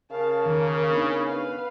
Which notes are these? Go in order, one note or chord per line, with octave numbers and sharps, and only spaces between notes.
C#3 A#4 F5 A5
E2 D#3 A#3
B3 D4 D#4 B5
B4 F5